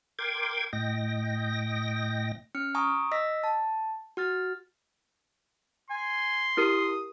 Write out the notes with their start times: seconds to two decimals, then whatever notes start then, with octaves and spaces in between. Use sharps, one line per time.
0.19 A#4 G5 C6 D6 G#6
0.73 A2 D#5 G5 A#6
2.55 C#4 F6 C#7
2.75 G#5 A#5 C#6 D#6
3.12 D#5 E6 A#6 B6
3.43 A5
4.17 F#4 F6 A6
5.90 G#5 C6
6.57 E4 G4 A#4 D#6